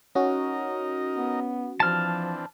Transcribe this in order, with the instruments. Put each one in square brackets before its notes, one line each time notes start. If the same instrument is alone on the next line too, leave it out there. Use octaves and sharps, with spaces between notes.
[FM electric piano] C#4 F#4 [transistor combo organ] D#4 A#4 D#5
[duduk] B3
[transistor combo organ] E3 C4 D4 [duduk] F3 [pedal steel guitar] A5 F6